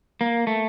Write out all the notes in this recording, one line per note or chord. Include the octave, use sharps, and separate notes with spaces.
A#3
A3